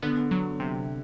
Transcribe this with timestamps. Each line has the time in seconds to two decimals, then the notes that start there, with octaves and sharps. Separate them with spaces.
0.02 D3 B3
0.31 F#3
0.60 C3